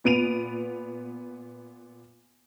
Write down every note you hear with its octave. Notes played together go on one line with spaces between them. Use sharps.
A#2 B3 D7 D#7 F7